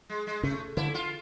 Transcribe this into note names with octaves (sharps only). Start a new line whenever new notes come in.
G#3
G#3
C#3 A3
D3 E4
F4